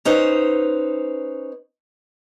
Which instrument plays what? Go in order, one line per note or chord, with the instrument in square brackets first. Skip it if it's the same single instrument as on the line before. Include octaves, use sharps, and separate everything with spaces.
[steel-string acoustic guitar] C#4 D#4 B4 C5